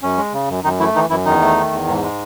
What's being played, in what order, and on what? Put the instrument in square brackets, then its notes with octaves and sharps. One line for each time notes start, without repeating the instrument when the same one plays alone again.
[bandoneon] F#2 C#4
G#3
C#3
F#2
F#2 D#3 D#4
E3 A3 E4
D#3 E3 D#4
F#2 E3 E4
E2 D#3 D#4
A3
D#3
E2
G#2
G#3